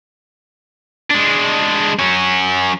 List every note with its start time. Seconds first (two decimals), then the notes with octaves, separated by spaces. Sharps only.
1.10 G#3 D4
1.99 F#3 C#4